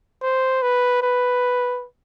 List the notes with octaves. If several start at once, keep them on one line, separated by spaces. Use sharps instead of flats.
C5
B4
B4